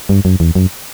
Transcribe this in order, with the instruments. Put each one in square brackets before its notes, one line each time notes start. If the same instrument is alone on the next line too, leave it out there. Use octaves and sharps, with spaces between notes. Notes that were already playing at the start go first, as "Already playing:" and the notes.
[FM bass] G2
F#2
E2
F#2